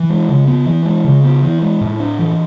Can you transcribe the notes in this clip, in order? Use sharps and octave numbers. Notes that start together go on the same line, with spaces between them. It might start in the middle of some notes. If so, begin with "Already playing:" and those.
Already playing: E3
G#3
C#3
B3
E3
G#3
C#3
B3
E3
G#3
A2
D4
E3